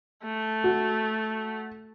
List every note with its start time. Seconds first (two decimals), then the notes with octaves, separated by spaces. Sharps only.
0.24 A3
0.64 F#4